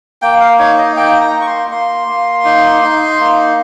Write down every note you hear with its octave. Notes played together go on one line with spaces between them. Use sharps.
A#3 G5
F5
D#4 C#5
D#5
A#3 G5
A#5
A#3
C#6
C6
A#3 C6
A#3
D#4
D#4
A#3